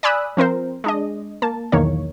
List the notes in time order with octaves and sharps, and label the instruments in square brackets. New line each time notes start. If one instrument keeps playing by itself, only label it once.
[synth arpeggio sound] D5 G#5 B5 D#6 E6 F#6
F3 C4 A#4 C5
G#3 D4 D#5
A#3 A5
B1 E2 D#3 A#3 C#5